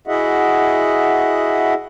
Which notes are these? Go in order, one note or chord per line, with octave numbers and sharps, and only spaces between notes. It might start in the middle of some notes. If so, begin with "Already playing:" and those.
E4 F#4 G#4 D#5 E5 F#5